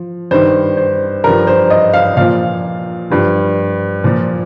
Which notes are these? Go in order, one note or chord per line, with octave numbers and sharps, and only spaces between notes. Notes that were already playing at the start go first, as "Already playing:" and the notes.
Already playing: F3
G2 D#3 C5
C5
G2 F3 A#4
C5
D#5
F5
A#2 F3 F5
G2 F3
A#2 F3